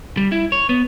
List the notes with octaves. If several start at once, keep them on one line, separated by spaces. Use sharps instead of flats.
G3
E4
C#5
B3